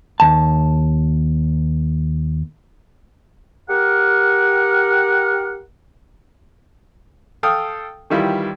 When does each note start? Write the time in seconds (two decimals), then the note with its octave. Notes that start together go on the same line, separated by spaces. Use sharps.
0.20 D#2 A5
3.70 G4 A#4 F#5
7.43 A4 F5 G5 D#6 F6
8.10 D#3 E3 G3 E4 F4